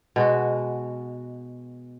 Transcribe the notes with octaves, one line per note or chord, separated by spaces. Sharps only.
B2 G#3 F#4